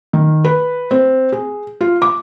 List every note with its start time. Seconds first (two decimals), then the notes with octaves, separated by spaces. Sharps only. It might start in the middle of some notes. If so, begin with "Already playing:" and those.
0.13 D#3
0.45 B4
0.91 C4
1.32 G#4
1.81 F4
2.02 D6